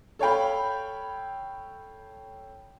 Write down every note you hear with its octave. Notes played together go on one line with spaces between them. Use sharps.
A4 C#5 F5 G5 B5